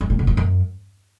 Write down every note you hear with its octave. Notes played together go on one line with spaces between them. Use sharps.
G2
A#2
B2
A#2
F#2